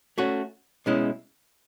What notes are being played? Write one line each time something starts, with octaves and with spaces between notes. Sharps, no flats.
A3 C#4 F#4
B2 G#3 C#4 E4